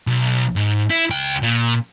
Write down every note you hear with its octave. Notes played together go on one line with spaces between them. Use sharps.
B1
G#2
E4
C#2 G5
A#2